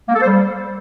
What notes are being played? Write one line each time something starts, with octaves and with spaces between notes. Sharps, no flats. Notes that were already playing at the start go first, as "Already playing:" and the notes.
A#3
A4
C5
G3